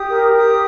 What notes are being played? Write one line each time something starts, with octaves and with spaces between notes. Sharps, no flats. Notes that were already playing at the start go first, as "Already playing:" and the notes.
Already playing: G4 D#6
A#4
G4 D#6